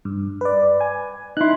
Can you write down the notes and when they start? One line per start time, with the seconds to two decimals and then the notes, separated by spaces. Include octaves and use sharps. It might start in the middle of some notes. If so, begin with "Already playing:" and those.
0.05 G2
0.41 B4 D5
0.81 G#5
1.37 D#4 E4 C6 F#6